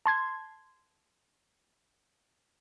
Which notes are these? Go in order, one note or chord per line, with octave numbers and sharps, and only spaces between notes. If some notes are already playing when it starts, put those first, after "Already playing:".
A5 C6 G#6